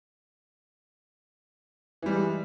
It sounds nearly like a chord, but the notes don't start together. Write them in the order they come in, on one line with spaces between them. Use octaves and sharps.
E3 G3 G#3